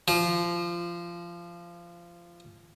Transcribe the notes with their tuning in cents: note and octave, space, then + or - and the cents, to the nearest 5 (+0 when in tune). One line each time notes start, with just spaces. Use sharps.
F3 -20